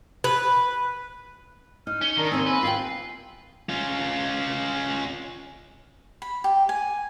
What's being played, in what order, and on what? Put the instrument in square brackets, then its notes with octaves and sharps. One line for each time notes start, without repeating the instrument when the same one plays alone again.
[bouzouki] B4
[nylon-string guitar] D#4 [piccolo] F6
[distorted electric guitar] C#4 [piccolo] G7
[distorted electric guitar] D#3 [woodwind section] D4 A#4 [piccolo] A#5
[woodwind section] D#2 G#5 [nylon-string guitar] A#3 C4 [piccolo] E6
[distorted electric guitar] B4
[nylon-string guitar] F4 E5 G5 [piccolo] C7
[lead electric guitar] C#4 F4
[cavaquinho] B5
G4
G#5